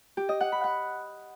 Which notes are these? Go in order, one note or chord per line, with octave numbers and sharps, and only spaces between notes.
G4
D#5
F#5
B5
F#5